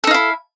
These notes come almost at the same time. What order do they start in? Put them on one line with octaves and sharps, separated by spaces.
A4 D#4 F5 E4